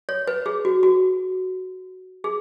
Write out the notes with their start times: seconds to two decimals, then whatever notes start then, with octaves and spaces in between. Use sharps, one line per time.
0.09 C#5
0.27 B4
0.46 G#4
0.65 F#4
0.83 F#4
2.24 G#4